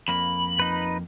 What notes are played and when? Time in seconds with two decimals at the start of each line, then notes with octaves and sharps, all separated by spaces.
0.08 F2 A#3 B5
0.59 D#4 B4